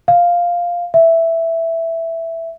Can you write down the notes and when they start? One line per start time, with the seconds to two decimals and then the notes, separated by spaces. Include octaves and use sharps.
0.08 F5
0.94 E5